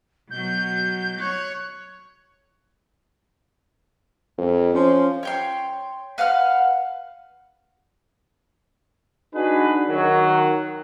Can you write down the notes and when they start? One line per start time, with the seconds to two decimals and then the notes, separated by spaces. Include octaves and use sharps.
0.30 B2 F#3 G6
1.19 C#5 F#6
4.38 F2
4.74 F3 C#4
5.23 C#5 G5 C6
6.18 B4 F5 F#5 F6
9.34 D4 D#4 F#4 G#4 B4
9.88 D#3 F#3